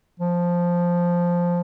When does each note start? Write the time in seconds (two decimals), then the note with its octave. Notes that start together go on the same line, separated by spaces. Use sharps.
0.20 F3